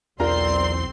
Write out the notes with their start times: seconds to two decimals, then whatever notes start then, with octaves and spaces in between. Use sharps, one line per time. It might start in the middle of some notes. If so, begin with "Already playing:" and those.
0.20 B1 E2 C4 F4 A#4 D5 A#5 C6